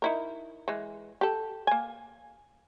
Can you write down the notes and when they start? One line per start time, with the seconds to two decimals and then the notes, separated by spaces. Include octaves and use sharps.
0.02 D#4 E4 A#4
0.68 E3 G#3
1.21 G4 A4
1.67 A#3 G#5